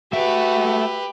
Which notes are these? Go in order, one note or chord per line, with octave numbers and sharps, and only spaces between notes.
A3 F#4 G4 B4 E5